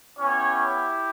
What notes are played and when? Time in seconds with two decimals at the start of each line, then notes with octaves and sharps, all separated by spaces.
0.19 B3 C#4 E4 G4 C#5